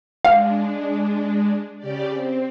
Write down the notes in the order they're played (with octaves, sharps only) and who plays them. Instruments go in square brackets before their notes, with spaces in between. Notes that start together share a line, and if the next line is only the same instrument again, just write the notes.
[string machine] G#3 D4 [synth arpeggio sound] F5
[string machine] C#3 G4 D5
C4